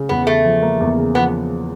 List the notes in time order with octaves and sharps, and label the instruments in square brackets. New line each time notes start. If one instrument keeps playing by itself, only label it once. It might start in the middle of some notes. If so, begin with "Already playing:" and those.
Already playing: [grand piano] C#3
[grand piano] E2 [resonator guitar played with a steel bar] B3
[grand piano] C#3 [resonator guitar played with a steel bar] A3
[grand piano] F3
A#3
E2
C#3
[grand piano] F3 [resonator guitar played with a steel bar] B3